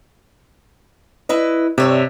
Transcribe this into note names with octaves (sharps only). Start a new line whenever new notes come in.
E4 B4 D#5
G2 C3 C#5 E5